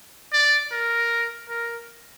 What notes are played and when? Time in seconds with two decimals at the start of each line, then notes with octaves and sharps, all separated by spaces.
0.33 D5
0.72 A#4
1.49 A#4